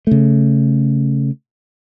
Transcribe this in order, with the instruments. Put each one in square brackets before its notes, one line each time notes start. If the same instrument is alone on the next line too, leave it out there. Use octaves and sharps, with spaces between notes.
[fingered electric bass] C#3 A3